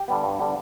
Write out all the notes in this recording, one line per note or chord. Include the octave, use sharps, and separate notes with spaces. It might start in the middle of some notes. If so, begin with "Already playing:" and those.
Already playing: G4
D3 G3 B3
G2
D3 G3 B3